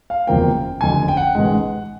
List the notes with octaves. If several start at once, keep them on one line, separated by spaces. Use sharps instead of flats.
F5
F#1 E2 C3 F3 A#3 G5
F#1 F2 D3 G#5
G5
F#5
A1 G#2 D#3 G#3